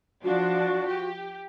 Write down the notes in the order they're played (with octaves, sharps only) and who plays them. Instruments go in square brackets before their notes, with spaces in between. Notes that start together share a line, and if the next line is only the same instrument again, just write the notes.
[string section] F3 D4 [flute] F#4
[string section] G4